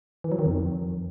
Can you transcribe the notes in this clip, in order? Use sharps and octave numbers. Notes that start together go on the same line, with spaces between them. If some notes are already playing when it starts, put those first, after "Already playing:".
E3
F#3
D#3
F2